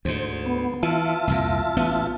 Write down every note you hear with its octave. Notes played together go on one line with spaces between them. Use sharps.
D2 G#2 C5
B3
E3 F4 E5 A5
C2 F2 A#2
A1 B3